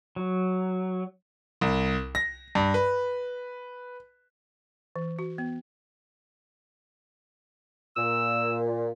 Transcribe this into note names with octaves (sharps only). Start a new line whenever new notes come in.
F#3
C2
A#6
G2
B4
E3
F#4
B3
A#2 E6